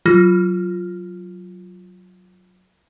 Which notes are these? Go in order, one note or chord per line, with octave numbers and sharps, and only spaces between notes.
F#3 F4 F6 A#6